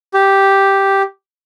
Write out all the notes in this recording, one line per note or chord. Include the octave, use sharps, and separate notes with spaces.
G4